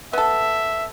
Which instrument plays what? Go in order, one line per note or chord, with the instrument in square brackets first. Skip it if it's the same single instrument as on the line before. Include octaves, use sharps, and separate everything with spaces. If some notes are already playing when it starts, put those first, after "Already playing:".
[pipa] B3 A4 [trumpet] E5